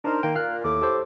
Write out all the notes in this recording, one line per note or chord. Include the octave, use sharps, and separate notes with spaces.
D4 D#4 A#4 C5
D#3 A#3 G5
A#2 F5 F6 F#6
D#2 A2 A4 D6
G4 A4 C5